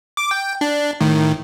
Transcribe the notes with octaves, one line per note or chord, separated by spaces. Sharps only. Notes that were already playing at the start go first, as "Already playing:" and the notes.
D6
G5
D4
A2 D#3